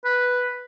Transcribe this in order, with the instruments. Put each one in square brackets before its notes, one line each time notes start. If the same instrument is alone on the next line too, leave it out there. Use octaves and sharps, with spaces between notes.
[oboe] B4